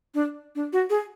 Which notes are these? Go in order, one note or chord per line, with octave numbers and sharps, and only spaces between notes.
D4
D4
F#4
G#4